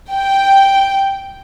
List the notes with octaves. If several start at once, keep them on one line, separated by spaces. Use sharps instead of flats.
G5